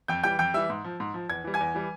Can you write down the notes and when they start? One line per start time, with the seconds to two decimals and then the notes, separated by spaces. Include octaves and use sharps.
0.08 F2 G5 G6
0.23 E3 G3 G5 G6
0.39 F2 G5 G6
0.54 E3 G3 E5 E6
0.70 G#2
0.84 F3
1.00 G#2
1.14 F3
1.29 E2 G#6
1.44 E3 G3
1.54 G#5 G#6
1.60 E2
1.75 E3 G3